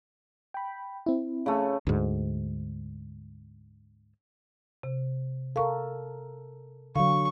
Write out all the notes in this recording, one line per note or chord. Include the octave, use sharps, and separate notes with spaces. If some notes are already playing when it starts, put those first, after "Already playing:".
G5 B5
C4 E4
C#3 A3
D2 G#2
C3
A4 A#4 F5 C#6
D3 F#3 F5 C#6